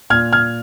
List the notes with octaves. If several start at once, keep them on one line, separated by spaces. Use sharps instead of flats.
A#2 F6 G#6
F6 G#6